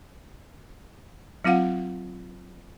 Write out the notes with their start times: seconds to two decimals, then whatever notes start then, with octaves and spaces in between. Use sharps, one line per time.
1.44 F#3 C4 F4 F5 F#5